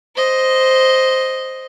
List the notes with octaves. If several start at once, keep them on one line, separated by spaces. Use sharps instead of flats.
C5 D#5